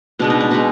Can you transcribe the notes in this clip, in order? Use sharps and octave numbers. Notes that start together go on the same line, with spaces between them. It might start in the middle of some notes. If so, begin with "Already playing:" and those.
B2 G#3 B3 D4
D#4
D4
B2 G#3 B3 D#4